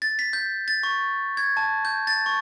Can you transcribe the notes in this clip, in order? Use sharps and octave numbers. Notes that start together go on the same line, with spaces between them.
A6
B6
G6
A6
C#6
G#6
A5
G6
A6
C#6